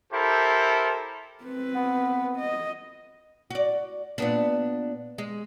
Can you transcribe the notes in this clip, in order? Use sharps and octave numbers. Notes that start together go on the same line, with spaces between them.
E4 G4 A4 A#4 C5
C4 B4
B3
D#5
F#4 D5
A#2 B3 D4
G#3